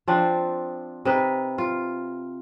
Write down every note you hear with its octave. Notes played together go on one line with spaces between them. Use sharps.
F3 C4 D4
C3 D#4 B4
F4